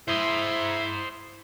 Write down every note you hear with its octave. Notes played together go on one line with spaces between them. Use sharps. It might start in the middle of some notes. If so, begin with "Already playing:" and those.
E4 C5 D#5